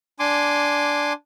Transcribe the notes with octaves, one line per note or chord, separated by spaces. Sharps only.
D4 G#5 C6 D6